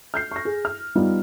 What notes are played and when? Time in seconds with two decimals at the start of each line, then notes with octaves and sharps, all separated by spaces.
0.14 F6 G6 C7
0.32 C#6 A#6
0.45 G#4
0.65 F6
0.95 G3 B3 D#4 F4